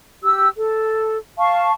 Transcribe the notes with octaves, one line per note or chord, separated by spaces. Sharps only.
G4 E6
A4
F5 A5 C#6